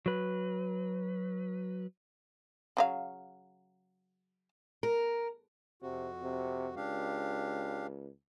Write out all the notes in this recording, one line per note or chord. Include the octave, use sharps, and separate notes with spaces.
F#3 B4
C#3 F#3 F5
A#4
F2 C3 F#4
C3
C#2 D4 G4 F5